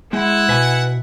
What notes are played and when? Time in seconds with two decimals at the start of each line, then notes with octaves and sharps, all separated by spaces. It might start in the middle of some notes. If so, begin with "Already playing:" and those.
0.13 G#3 E4 F#5
0.49 B2 B4 G#5